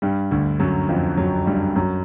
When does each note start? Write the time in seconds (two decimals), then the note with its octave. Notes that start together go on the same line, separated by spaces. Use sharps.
0.02 G2 G3
0.31 D2 D3
0.60 F#2 F#3
0.89 F2 F3
1.17 F#2 F#3
1.47 G2 G3
1.76 F#2 F#3